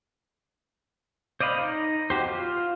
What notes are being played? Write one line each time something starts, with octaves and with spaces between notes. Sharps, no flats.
C5 D5 D#5 F5 B5
D#4
F#4 G4 C5
F4